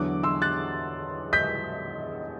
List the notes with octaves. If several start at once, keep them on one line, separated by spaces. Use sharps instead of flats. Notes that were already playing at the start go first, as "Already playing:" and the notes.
Already playing: E2 D3 F#3 D6 F#6
C6 E6
F#6 A6
G6 B6